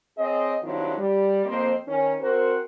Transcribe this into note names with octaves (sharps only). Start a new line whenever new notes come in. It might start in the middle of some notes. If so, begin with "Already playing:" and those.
C4 G#4 C#5 D#5
G2 D#3 F#3 C4 E4 F4
G3
F2 A#3 C4 C5 D#5
D#3 C#4
C4 F#4 A#4 C5